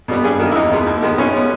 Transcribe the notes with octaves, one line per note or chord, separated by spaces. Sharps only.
B2 G3 B3
G2 G#4
D#3 A#3
E4
E2 D#4
B2 G#3 B3
D#2
D#3 G#3 B3
B2 C#4
G#3 B3